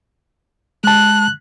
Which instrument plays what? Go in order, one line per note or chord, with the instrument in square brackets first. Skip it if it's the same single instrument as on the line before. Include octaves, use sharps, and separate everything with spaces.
[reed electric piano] G#3 A5 [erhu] F#6